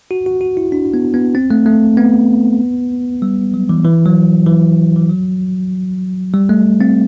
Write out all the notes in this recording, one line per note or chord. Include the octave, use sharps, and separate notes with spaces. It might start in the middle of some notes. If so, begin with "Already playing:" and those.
F#4
F#4
F#4
E4
D4
B3
B3
C4
A3
A3
B3
G3
F#3
E3
E3
F#3
E3
E3
F#3
G3
A3
C4